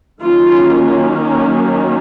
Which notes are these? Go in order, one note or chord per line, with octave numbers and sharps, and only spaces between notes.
D#3 F#3 A#3 C#4 F4